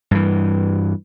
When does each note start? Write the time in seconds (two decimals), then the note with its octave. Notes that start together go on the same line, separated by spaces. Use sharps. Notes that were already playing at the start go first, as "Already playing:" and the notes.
0.11 G2 E3